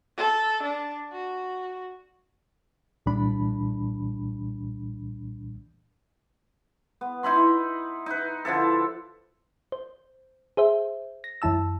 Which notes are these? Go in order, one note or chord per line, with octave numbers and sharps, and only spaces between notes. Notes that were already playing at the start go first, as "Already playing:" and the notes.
A4
D4
F#4
C2 A#2 E3 G3 D4 B5
B3
D#4 E4 B5 C6
D#4 B4
D3 F3 E4 A4
C5
G#4 C5 E5
A#6
F#2 E3 E4 A5 E6